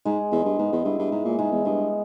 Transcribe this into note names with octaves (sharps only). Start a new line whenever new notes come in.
G#2 G#3
E2 G#3
G2
G#2 B3
E2
G2 E4
G2
G#2 G#3
A#2
G#2 G#3
E2
G2 B3